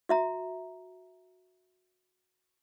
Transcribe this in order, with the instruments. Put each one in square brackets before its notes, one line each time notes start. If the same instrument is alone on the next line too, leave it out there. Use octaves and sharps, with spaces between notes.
[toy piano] F#4 E5 A#5